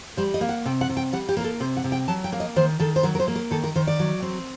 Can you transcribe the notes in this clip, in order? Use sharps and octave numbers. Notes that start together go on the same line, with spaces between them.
G3 C5
D#5
A#3
F#5
C3 G5
F#5
C3
G5
G3 F#5
G4
A#3 A#4
A4
C3 C5
F#5
C3
G5
F#3 A5
G5
A#3
D#5
D#3 C5
D#3 A4
C5
F#3 A#4
A#4
C5
A#3
A#4
D#3 A4
A#4
D#3 C5
D5
F#3
C4